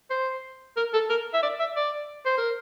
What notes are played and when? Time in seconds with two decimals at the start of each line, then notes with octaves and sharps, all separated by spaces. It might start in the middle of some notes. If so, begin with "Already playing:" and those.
0.10 C5
0.77 A#4
0.93 A4
1.10 A#4
1.34 E5
1.43 D5
1.60 E5
1.76 D5
2.26 C5
2.38 A#4